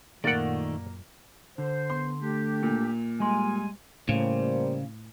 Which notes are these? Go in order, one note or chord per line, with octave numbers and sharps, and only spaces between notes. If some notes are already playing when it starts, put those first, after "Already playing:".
F#2 A#2 D#3 A3 A#3 D5 F#5
D3 C5
B3 C6
A3 D4 G4
A#2
G3 G#3 G#5 C6
A2 C#3 G3 A#3 C5